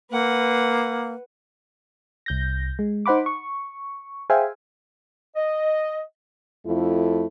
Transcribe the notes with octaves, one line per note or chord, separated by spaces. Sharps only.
A#3 B4 F#5
C2 G6 A#6
G#3
D#4 C5 F#5 B5 D6
C#6
G#4 C5 E5 F5 G5 G#5
D#5
F2 A3 E4 F4